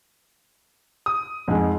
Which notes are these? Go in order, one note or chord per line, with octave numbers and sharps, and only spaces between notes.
D#6
F2 G#2 G#3